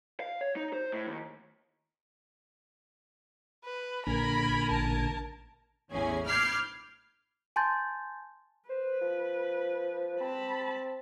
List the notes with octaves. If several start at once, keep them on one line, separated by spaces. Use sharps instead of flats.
F5
C#5
D#4
C5
A2
D#2
B4
A#1 A#2 D3 A#4 G#5 B5
A1 A5
A1 E2 C#4 G#4 G#5
B5 D6 F6 G6 G#6 C7
G#5 A5 C6 G6 A6
B4 C5
F3
C4 A5 B5